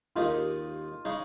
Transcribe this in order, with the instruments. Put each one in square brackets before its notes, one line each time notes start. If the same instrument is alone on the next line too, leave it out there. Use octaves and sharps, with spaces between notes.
[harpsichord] D#2 D#3 G#3 D#4 G4 [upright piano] F4
[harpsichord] C#3 G#3 D#4